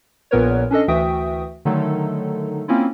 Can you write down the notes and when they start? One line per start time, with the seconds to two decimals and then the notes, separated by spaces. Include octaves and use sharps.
0.31 A#1 A#2 B3 A#4 B4 C#5
0.71 C#4 D4 A4 D#5
0.88 D2 E3 F#4 E5 G5 D#6
1.65 D3 D#3 F#3 A3 D#4 A4
2.68 A#3 C4 C#4 E4 F4